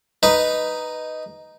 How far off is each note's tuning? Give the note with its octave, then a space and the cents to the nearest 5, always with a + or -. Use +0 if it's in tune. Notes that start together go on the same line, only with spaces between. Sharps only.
D#4 +0 B4 +0